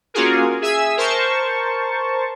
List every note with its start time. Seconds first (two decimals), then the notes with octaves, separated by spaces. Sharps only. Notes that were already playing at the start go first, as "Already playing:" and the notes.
0.14 A#3 C#4 F4 F#4 G#4 A#4
0.62 G#4 E5 G#5 E6
0.97 A#4 C5 A5 C#6